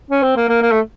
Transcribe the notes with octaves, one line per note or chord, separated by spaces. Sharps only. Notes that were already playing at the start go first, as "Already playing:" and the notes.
C#4
C4
A#3
A#3
A#3
A3